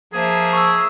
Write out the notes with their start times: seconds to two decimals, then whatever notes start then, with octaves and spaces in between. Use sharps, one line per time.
0.13 F3 A#3 G#4 E5
0.53 C#6 E6